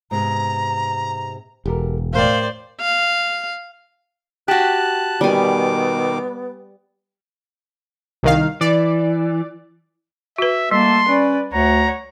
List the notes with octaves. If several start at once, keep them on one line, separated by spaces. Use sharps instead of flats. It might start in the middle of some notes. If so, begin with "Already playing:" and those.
G#2 C3 B3 A#5
E1 G4 A4 A#4
A2 A#4 C5 D5 F5 G5
F5
F#4 G4 A5 F#6
B2 D#3 G3 B3 G#5 D6
C2 D#3 F5
E3 D5
F#4 B4 E5
G3 A3 A#3 A5 C6
C#4 B4 D5
D2 C#5 F#5 A#5